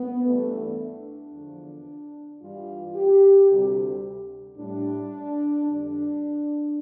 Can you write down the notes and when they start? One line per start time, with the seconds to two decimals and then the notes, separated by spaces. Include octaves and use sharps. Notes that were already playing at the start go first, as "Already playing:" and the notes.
Already playing: B3
0.25 G2 E3 G3 A3
0.79 D4
1.33 E2 D3 F3
2.41 G2 E3 G3 F4
2.95 G4
3.49 D2 C3 G3
4.57 A2 G3 D4
5.65 F2 D3 G3 D4